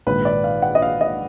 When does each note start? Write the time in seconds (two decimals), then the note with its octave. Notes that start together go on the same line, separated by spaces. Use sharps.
0.07 A#1 G#2 D#3 B4
0.25 D5
0.44 F5
0.62 F#5
0.75 D#5
0.82 F5
1.01 D#5